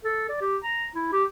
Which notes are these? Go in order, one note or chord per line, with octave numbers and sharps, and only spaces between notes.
A4
D5
G4
A#5
E4
G4